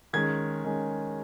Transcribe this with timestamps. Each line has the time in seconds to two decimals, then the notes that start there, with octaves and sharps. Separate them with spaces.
0.13 D#3 G#3 C#4 G#6
0.64 D#3 G#3 C#4